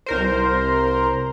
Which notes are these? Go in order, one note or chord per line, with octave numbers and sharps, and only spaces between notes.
C2 A#4 C5